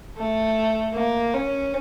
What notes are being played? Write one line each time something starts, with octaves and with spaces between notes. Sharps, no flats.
A3
A#3
C#4